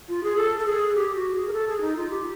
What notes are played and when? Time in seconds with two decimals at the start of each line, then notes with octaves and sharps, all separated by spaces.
0.09 F4
0.24 G#4
0.37 A4
0.59 A4
0.66 G#4
0.95 G4
1.15 F#4
1.34 G#4
1.48 A#4
1.53 A4
1.68 G#4
1.81 D#4
1.96 F4
2.10 G4